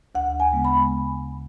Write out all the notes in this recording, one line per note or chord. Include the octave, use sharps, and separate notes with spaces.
D2 F#5
G#5
C#3 G#3 B3
B5